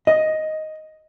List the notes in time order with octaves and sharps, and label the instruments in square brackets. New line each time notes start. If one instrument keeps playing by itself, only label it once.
[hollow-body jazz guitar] D#5